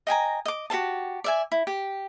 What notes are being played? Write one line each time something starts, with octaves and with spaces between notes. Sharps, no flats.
D#5 G5 G#5 A#5
D#5 D6
F#4 G4 C5 A5
D5 E5 G#5
E4
G4